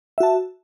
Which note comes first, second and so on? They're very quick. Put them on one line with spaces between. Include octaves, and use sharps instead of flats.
E5 F#4 A5